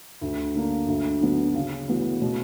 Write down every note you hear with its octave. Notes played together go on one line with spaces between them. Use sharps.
D2
D3 A#3 D4
D2
D3 F#3 B3
C#3
E3 B3 F#4
B2